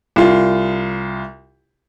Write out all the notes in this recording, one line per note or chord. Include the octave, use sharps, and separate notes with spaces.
C2 F4